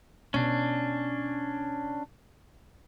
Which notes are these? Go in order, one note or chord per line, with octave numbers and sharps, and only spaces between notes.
B2 C#4 D4